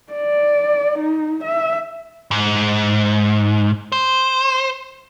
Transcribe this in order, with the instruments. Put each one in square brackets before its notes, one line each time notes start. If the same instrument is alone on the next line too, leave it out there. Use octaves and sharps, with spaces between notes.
[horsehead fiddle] D5
D#4
E5
[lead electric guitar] G#2
C5